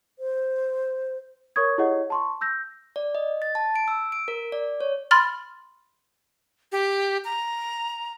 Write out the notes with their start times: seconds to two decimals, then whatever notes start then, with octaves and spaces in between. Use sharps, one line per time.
0.19 C5
1.56 A#4 C#5 C#6 D#6 G#6
1.78 E4 G4 G#4 C#5 D#5 F#5
2.10 A5 C6 C#6
2.41 E6 G6 A#6
2.96 D5
3.15 D#5
3.42 A6
3.55 A5
3.76 D7
3.88 E6
4.12 D7
4.28 A#4
4.52 D5
4.81 C#5
5.11 B5 C6 F6 A6
6.72 G4
7.24 A#5